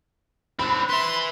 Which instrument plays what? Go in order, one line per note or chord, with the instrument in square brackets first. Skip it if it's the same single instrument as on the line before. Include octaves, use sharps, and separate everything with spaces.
[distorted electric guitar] C4 D4 [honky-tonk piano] B5
[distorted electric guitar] B4 E5 [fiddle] C6